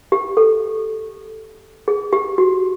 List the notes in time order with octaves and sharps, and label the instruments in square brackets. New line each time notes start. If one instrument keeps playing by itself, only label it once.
[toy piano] G4
A4
G#4
G4
F#4